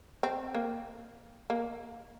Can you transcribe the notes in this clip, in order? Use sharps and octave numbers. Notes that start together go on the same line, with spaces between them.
C4
A#3
A#3